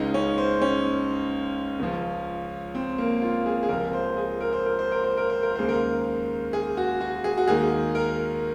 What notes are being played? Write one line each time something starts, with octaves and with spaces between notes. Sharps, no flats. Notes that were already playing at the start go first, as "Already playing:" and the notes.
Already playing: C#2 C#3 G#3 D#4
C#4
C5
C#4
C#2 C#3 F3
C4
A#3
F4
G#4
G#4
C#2 C3 F3 A#4
C5
G#4
A#4
C5
A#4
C5
A#4
C5
A#4
C5
A#4
D#2 C#3 G#3 C5
A#4
G#4
F#4
F#4
G#4
F#4
D#2 D#3 G#3 G#4
A#4